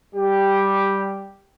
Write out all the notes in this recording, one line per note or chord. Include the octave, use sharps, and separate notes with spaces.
G3 G4